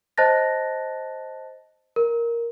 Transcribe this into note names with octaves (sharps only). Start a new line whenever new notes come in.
C5 D#5 A5 F#6 A6 A#6
A#4